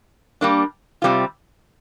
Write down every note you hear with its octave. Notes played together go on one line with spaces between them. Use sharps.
G3 A#3 D4
C3 D#3 G3 C4 F4